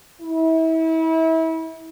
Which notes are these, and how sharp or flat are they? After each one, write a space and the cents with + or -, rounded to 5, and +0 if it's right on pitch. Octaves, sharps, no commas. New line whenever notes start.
E4 -30